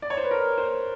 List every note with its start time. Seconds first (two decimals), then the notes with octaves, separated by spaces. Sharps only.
0.02 D5
0.10 C#5
0.17 C5
0.24 B4
0.31 A#4
0.58 C5